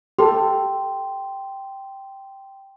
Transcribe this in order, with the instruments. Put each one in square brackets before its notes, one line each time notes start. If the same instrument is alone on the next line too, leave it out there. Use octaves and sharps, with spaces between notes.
[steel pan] G4 A4 [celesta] G5 C6